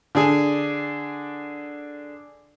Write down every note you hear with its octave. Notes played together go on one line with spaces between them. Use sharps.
D3 D4 G#4 G#5